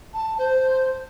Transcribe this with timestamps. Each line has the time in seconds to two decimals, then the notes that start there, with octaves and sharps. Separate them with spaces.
0.14 A5
0.38 C5